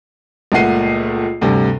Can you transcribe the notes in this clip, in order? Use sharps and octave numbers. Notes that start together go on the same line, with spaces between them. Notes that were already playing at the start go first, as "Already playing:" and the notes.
C#2 A#2 A3 F#5 C7 D#7
D2 G2 C3